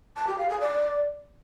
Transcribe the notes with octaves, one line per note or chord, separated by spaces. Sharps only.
A5
G4
F5
G#4
D5